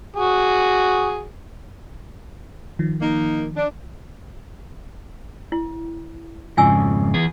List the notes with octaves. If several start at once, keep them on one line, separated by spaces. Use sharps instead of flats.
F#4 G#4
D#3 F3
A#3 D#4
D4
E4
F2 G#2 C#3 F4 G#5 E6
E2 B3 G#4